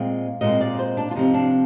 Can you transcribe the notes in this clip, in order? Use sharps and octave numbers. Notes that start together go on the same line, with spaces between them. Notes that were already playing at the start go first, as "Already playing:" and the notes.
Already playing: A#2 G#3 C4
A#2 G#3 C4 D#5
D5
C5
D4
F4
C3 F3 C4 D#4
D4